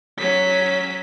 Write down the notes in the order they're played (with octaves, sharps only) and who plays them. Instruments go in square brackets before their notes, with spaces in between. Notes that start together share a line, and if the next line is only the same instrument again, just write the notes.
[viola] F#3 C#4 [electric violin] B6